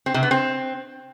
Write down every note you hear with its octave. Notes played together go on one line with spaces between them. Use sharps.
C4
C3
B3
C4